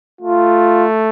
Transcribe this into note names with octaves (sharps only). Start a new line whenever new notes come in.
A3 F4